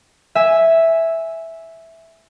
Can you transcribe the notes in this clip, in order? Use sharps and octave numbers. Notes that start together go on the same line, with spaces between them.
E5 G#5